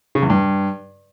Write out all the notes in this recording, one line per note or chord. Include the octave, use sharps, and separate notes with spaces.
C#3
E2
G2